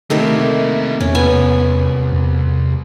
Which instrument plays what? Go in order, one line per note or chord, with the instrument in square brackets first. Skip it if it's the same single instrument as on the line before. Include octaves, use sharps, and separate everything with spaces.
[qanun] C3 D#3 A3 [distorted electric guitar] A#3 E4
[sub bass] E2 [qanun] C#4
[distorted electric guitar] C2 [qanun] B3 C#5 G#5
[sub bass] E2